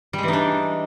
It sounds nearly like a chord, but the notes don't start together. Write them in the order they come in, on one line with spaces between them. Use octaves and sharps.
G3 G#3 E3 D#4 D4